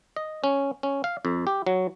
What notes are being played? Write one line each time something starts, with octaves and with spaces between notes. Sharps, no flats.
D#5
C#4
C#4
F5
F2
G4
F#3